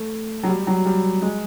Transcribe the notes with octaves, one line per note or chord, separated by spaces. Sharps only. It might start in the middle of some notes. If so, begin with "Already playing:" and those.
Already playing: A3
F#3
G3
F#3
G3
G#3